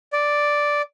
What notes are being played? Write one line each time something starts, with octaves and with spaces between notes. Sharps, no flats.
D5